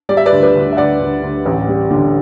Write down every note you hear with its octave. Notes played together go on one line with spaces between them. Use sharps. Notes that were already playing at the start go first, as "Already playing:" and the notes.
G3 D5
E5
B4 D5
D2
B4 D5
D2
E5
D2 D5 F#5
D2
D2
A1
G3
D3